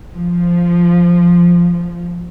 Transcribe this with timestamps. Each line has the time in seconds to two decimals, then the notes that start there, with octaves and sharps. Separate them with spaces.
0.13 F3